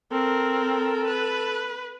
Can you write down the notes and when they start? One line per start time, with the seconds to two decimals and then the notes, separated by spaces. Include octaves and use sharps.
0.12 C4 A4 A#4
1.07 B4